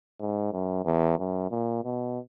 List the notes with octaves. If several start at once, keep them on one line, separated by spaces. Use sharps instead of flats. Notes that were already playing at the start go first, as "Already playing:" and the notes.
G#2
F#2
E2
F#2
A#2
B2